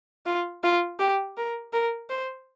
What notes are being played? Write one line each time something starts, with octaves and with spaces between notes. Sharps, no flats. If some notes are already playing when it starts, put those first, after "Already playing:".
F4
F4
G4
A#4
A#4
C5